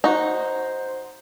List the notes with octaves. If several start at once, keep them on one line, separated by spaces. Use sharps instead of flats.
D#4 F#4 C5